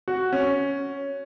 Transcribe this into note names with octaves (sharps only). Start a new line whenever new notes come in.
F#4
C#4